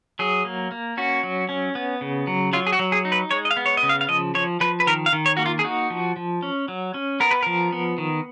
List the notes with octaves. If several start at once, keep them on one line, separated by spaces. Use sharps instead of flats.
F#3 G#4
A#3
A#3
C#4 F#4
F#3
C#4
B3
C#3
F#3
F#3 F4
G#4
F#4
F#3
G#4
D#4
B4
G#3 C#5
D#5
F5
B3
C#5
D#5
C#3
F5
F5
F3 D#5
F3 C#5
F3 B4
B4
D#3 A#4
F5
D#3
C#5
A#3 F#4
F4
G#4
D#4 F#4
F3
F3
C#4
F#3
C#4
B3 A#4
B4
F3 A#4
B3
D#3